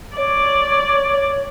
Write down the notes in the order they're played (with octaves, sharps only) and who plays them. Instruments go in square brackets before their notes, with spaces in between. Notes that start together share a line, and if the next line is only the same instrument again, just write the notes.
[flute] C#5 [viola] D5